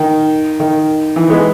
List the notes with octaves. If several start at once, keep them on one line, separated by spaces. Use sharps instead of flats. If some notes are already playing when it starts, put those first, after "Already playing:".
Already playing: D#3
D#3
E3
G#3 B3